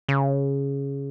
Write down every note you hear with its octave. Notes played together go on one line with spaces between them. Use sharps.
C#3